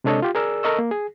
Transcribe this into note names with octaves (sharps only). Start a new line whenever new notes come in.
C3 G#3 D4 A4 C#5 D#5
F4 G4
G#4 A#4 D5 E6
A4 A#4 D#5 C#6 E6
A#3
G#4